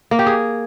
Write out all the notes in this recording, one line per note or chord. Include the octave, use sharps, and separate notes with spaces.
A#3
G4
G#4